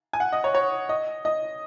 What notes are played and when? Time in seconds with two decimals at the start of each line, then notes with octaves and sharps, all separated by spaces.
0.13 G#5
0.20 F#5
0.32 D#5
0.44 C#5
0.55 C#5
0.89 D#5
1.25 D#5